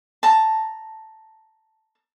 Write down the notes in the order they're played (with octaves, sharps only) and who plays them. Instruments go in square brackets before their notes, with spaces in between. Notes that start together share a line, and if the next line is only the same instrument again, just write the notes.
[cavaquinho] A5 A#5